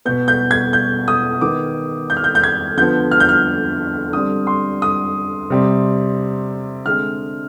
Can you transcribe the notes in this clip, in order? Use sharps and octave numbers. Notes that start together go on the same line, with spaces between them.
B2 B3 G6
G6
G#6
G6
D#6
D#3 B3 D6
G6
F6
G6
G6
G#6
D3 F3 B3 G6
F6
G6
F6
D3 G3 C4 D#6
C6
D#6
C3 G3 C4
D3 G#3 C4 F6